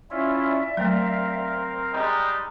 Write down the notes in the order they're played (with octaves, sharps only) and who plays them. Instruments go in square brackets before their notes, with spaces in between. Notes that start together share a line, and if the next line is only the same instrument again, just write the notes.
[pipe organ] C#4 E4 F4 [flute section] D5 E5
[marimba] F#3 A3 [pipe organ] C4 A#4 F5
[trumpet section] G3 G#3 D#4